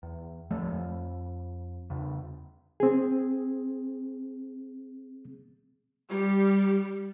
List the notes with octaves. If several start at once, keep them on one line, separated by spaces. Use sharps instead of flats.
E2
D1 F3 A3
F2
E2 C#3
C4 G#4
G3